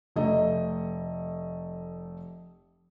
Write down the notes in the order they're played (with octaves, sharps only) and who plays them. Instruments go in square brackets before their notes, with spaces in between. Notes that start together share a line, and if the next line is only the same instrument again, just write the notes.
[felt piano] F1 A3 D#5